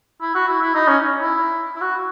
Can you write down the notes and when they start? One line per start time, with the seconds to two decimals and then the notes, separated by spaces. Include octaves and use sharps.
0.21 E4
0.35 F#4
0.48 E4
0.61 E4
0.75 D#4
0.88 C#4
1.21 E4
1.76 E4
1.81 F#4